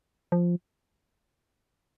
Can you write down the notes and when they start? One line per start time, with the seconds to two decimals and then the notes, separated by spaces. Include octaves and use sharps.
0.32 F3